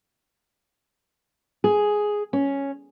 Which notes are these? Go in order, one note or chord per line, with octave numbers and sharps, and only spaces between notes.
G#4
C#4